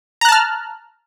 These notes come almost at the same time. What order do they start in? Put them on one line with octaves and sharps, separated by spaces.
A#5 F#6 A5 F6